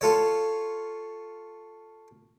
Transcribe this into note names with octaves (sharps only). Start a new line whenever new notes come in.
F4 A4 C#5